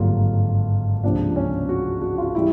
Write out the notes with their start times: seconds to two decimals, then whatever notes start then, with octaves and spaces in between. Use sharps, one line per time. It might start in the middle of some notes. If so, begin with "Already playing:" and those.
Already playing: G#1 G2 D3 F#3 A#3 F4
1.03 C#2 C3 F3 A#3 D4
1.36 C#4
1.69 F#4
2.02 F#4
2.18 F4
2.35 E3 G3 E4